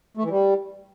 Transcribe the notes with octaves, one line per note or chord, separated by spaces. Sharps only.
A3
E3
G3